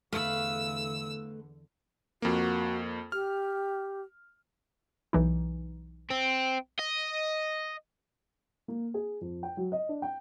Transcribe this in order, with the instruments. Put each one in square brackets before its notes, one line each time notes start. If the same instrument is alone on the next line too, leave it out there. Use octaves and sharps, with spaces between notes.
[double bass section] E2 D3 [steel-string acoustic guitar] A3 B4 [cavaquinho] F5 [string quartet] E6
[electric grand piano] F2 A#3 [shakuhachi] F#4
[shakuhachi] G4 [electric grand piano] F6
[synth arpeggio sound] B1 E3 D#4
[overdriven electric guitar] C4
D#5
[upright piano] A#3
G#4
F2
G5
F#3
D#5
D4
G5